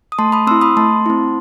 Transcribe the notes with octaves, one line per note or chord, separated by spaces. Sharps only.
D#6
A3 A5 C6
B5 D#6
C4 E4 C6 E6
B5 D#6
A3 A5 C6
C4 E4